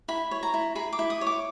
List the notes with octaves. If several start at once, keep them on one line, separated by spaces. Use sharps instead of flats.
E4 B5
C#5
A#5
E4
G#4 B5
D6
E4
D#6
C#5
D6